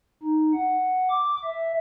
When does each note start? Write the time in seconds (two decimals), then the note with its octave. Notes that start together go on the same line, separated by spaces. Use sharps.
0.23 D#4
0.53 F#5
1.10 D6
1.44 E5